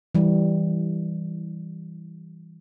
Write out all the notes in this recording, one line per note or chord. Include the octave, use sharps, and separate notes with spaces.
E3 G3